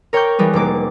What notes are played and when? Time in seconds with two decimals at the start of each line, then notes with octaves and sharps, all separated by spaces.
0.13 A#4 C#5 G5 C#6 D6 G6
0.39 E3 G3 G#3 B3
0.54 F1 A#3 D6